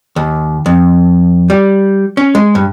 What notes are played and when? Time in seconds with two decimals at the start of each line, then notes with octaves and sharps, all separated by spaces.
0.16 D#2
0.66 F2
1.50 G3
2.17 C#4
2.35 G#3
2.55 G2